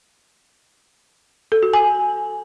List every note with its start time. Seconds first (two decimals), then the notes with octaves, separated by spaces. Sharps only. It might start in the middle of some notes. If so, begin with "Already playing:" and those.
1.52 A4
1.63 F#4
1.73 G#5